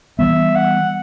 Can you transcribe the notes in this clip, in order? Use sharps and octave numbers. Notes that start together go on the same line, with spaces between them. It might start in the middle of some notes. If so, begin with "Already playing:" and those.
E3 G3 B3 E5
F#5